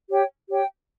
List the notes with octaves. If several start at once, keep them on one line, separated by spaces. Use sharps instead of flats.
G4 C#5 G5
G4 C#5 G5